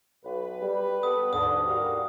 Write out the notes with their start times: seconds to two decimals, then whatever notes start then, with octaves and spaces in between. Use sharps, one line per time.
0.25 B1 B4
0.62 G3
1.03 B3 G4 A4 D#6
1.33 D#2 G#2 D3 D#6
1.68 G3 F#4 A#4 F5